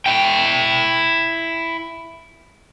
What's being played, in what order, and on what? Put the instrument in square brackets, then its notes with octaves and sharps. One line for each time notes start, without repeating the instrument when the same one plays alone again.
[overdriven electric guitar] E4 G5